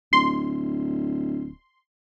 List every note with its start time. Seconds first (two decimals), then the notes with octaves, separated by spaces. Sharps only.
0.13 D1 C6